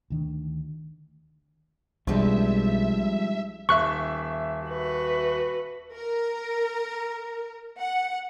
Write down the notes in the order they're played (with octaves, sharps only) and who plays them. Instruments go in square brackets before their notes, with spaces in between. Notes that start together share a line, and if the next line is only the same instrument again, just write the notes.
[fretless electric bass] D2 D#3 D4
[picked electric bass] B1 [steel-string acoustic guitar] F3 G#3 C4 [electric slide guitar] G3 D4 D#4 [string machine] E5
[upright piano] D#1 E5 [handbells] C#6 F#6
[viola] F#4 B4
[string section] A#4
F#5